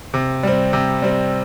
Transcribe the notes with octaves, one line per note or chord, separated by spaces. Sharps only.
C3
G3 C4
C3
G3 C4